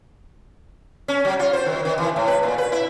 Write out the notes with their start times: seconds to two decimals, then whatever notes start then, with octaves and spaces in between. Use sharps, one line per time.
1.08 C#4
1.25 F#3
1.39 F4
1.53 C5
1.66 D#3
1.85 D#3
1.98 E3
2.16 A2
2.28 B4
2.43 A#2
2.58 B4
2.72 E4